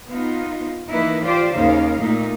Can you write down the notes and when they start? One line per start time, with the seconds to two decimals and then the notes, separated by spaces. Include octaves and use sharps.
0.10 B3 D#4 F4
0.90 E3 A#3 D#4 E4 B4
1.25 F4 G4 C5 D5
1.55 D#2 C#3 D#4 F5
2.00 A#2 A3 D#4